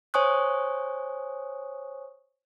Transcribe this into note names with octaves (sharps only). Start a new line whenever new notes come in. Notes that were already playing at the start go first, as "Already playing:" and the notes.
C5 C#5 G#5 C#6 D#6 F#6